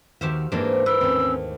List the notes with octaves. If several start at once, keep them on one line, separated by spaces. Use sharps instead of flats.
D#2 D#3 F#4 G4 C5 E5 F5
G#2 E3 A#3 D4 G4 A#4 C5 D6
B4 E6
D#2 A3 C4 C#4